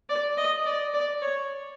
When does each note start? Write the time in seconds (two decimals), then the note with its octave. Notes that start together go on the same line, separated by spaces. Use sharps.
0.10 D5
0.37 D#5
0.66 D5
0.94 D5
1.22 C#5